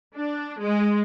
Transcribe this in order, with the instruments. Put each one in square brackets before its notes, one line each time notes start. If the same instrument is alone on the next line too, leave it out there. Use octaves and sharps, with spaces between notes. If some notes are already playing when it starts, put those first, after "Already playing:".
[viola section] D4
G#3